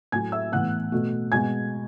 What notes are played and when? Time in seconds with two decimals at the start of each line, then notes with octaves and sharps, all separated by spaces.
0.12 A2 F#3 A3 G#5 G#6
0.32 E5 E6
0.52 A2 E3 B3 F#5 F#6
0.92 B2 A3
1.32 B2 G#3 B3 G#5 G#6